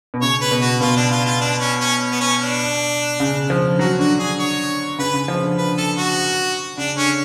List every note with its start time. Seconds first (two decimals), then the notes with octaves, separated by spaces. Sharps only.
0.14 B2
0.21 C#3 C#5
0.41 B4
0.51 B2
0.62 F#4
0.81 B2 F4
0.96 D4
1.11 F4
1.26 F4
1.41 D4
1.60 C#4
1.80 C#4
2.11 B3
2.20 C#4
2.41 D4
3.20 C#3
3.50 F3
3.79 F#3 F#4
3.99 D3 F#4
4.19 D3 G#4
4.39 C#5
4.99 C#3 B4
5.14 C#3
5.28 F3
5.43 D3
5.58 B4
5.78 A4
5.98 F#4
6.77 C#3 D4
6.97 D3 C#4